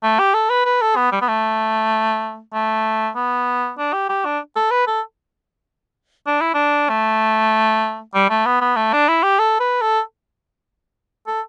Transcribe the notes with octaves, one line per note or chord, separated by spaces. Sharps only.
A3
G4
A4
B4
B4
A4
B3
G3
B3
A3
A3
B3
D4
G4
G4
D4
A4
B4
A4
D4
E4
D4
A3
G3
A3
B3
B3
A3
D4
E4
G4
A4
B4
A4
A4